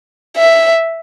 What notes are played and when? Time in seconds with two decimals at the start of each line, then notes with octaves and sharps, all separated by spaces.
0.37 E5